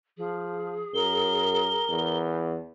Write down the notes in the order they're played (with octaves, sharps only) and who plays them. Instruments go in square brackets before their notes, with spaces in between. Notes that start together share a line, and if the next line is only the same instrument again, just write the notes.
[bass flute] F3 [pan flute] G#4
[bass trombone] F#2 [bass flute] A#4 [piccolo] G7
[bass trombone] E2